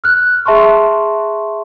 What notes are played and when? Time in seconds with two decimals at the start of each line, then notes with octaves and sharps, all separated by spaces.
0.04 F6 F#6
0.46 G#4 E5 A5 C6 C#6